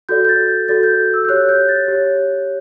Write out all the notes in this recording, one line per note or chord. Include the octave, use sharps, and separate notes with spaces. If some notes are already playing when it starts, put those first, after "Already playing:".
F#4 A4 D5 G6
G6
A6
G6
F#4 A4 D5 A6
G6
E6
G6
G4 C#5 F#6
G6
A6
G4 C#5